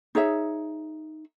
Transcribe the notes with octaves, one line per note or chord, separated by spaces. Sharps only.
D#4 G#4 C#5 E5